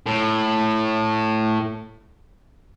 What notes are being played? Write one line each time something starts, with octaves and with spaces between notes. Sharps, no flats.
A2